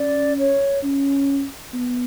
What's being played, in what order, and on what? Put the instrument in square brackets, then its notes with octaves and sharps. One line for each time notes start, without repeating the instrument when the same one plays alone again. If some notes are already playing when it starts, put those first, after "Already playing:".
Already playing: [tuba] C#4 [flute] D5
[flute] C#5
[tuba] C#4
B3